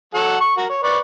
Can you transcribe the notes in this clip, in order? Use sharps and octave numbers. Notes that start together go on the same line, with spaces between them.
F#3 A4 F#5
C#6
F#4 A#4
C#5
B4 D5 C#6